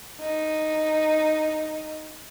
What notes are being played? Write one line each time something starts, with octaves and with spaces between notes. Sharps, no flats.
D#4